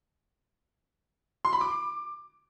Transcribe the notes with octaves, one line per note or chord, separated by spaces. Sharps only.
C6
B5
D6